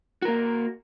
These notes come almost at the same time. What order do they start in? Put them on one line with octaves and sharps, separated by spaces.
F#4 A#4 A#3